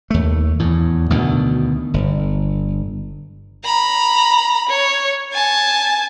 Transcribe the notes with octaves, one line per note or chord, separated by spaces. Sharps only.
D#2 A3
E2 A2
D2 B2 D#3
G1
A#5 B5
C#5
G#5 A5